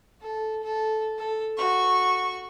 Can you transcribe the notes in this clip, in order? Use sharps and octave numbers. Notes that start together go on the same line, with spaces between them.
A4
A4
A4
F#4 C#6